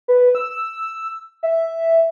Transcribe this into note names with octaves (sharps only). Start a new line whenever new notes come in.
B4
E6
E5